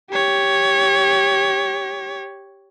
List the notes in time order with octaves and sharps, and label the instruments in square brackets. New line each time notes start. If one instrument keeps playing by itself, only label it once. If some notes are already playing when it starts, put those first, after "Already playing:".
[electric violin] G4 C#5